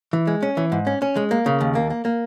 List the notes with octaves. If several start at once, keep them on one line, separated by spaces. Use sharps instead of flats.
E3
G#3
C#4
E3
G#2
C#4
C#4
G#3
A#3
C#3
D#2
A#3
A#3
A#3